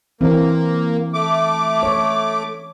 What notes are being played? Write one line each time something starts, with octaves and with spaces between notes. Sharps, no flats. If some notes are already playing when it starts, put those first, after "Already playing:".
E3 A#3 C4
A3 D6
C#5